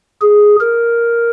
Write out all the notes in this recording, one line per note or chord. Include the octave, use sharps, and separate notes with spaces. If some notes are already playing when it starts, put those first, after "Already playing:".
G#4
A#4